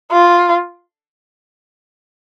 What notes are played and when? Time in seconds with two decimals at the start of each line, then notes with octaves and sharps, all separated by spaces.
0.12 F4